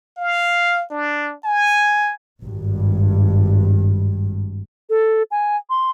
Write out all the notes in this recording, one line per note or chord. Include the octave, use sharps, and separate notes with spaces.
F5
D4
G#5
G#1 G2
A4
G#5
C6